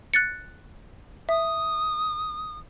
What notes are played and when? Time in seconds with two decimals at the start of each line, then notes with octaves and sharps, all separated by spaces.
0.14 F#6 A6 C#7
1.29 E5 D#6